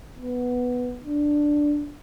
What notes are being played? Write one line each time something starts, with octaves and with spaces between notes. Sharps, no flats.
B3
D4